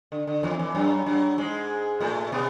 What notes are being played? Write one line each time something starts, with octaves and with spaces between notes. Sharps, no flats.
D3
D3
E2 E3
E2 E3
F#2 F#3
F#2 F#3
G#2 G#3
A2 A3
B2 B3